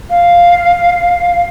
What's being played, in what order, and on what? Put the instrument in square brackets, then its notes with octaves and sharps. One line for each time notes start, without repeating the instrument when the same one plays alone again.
[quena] F5